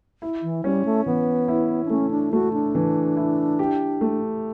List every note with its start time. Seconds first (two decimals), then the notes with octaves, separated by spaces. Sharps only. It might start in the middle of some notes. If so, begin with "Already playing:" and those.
0.22 E4
0.43 E3
0.64 G3 C#4
0.85 A3
1.06 E3 B3
1.48 E4
1.86 D4
1.90 A3 C#4
2.11 D4
2.33 A3 F#4
2.53 D4
2.75 E3
3.17 E4
3.59 G4
4.01 A3